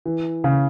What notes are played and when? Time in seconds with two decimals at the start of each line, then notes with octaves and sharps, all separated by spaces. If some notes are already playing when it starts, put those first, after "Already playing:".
0.06 E3
0.44 C#3